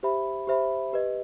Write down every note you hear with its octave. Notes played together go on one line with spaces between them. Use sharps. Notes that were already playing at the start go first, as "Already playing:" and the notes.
G4 C5 E5 B5
G4 C5 E5 B5
G4 B4 D#5